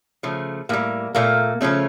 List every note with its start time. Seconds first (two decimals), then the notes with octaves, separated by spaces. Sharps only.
0.23 C#3 F3 A3
0.69 A2 G3 A#3
1.15 A#2 A3 A#3
1.61 C#3 F3 A3 C#4